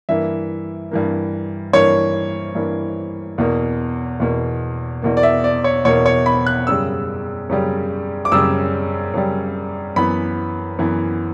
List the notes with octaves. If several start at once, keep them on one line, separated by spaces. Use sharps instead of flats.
G2 E3 A#3 E5
G2 E3 A#3
G2 E3 A#3 C#5
G2 E3 A#3
E2 B2 A#3
E2 B2 A#3
E2 B2 A#3
D5
E5
D5
C#5
E2 B2 A#3 C#5
C#5
B5
F#6
F#2 C#3 G3 E6
F#2 C#3 G3
D6
F#2 C#3 G3 E6
F#2 C#3 G3
F#2 E3 B3 B5
F#2 E3 B3